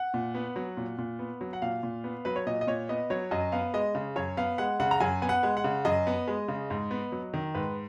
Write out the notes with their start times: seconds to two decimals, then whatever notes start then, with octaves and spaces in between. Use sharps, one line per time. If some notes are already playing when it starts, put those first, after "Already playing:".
Already playing: F#5
0.14 A#2
0.35 B3
0.56 F#3
0.77 A#2
0.98 A#2
1.19 B3
1.41 F#3
1.53 F#5
1.62 A#2 F5
1.83 A#2
2.04 B3
2.25 F#3 B4
2.36 C#5
2.46 A#2 D#5
2.61 D#5
2.67 A#2 C#5
2.89 B3 D#5
3.10 F#3 C#5
3.31 F#2 D#5
3.52 B3 F5
3.74 G#3 D#5
3.95 C#3
4.16 F#2 C#5
4.37 B3 F5
4.58 G#3 F#5
4.80 C#3 F#5
4.91 A#5
5.00 F#2 G#5
5.22 B3 G#5
5.29 F#5
5.43 G#3
5.57 F#5
5.64 C#3
5.85 F#2 D#5
6.07 B3
6.28 G#3
6.48 C#3
6.70 G#2
6.91 B3
7.12 F#3
7.34 D#3
7.55 G#2 B4